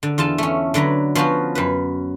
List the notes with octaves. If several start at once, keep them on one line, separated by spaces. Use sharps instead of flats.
D3
E2 F4 A4 A5
A3 C#4
D3 F#3 B4 A#5
F3 B3 C#4 F4 F#4
F#2 B4